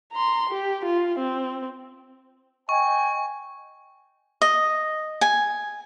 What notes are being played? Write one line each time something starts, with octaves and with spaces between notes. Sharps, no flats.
A#5 C6
G4
F4
C4
D#5 G5 G#5 C#6
D#5
G#5